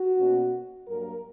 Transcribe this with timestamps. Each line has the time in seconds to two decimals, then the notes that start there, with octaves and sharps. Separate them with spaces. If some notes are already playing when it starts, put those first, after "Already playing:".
Already playing: F#4
0.17 B2 A#3 C#4
0.86 G2 F#3 A#3 A#4